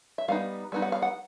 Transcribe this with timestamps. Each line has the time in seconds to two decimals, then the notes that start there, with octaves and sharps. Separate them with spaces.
0.18 E5
0.28 G3 B3 D#4 F5
0.72 G3 B3 D#4
0.82 F#5
0.92 F5
1.02 F#5